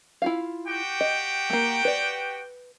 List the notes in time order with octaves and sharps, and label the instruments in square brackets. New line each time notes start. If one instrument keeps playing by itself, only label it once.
[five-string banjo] E4 F4 F5
[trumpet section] F#4 G4 G5
[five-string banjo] D#5
A3 A#3
B4 D5